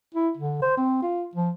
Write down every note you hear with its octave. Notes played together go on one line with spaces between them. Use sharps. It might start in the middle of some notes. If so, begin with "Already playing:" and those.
E4
D3
C5
C4
F4
F3